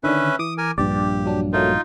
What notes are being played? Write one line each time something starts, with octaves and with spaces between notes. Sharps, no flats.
D3 D#3 C#4 D4 B4 E5
E3 D6 D#6
A#4 G#5
A#1 G2 G4 D5
F#3 D4
F#3 A3 A#3 D#4 F4